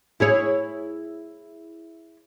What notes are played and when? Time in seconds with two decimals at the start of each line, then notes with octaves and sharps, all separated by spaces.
0.20 E4 G#4 C#5